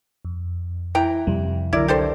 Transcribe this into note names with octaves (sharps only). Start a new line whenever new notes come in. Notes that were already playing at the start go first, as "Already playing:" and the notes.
F2
E3 G5 A#5
F2 C3 G3
C2 D3 F#3 E4 A#4 D5
G2 G4 A4 C5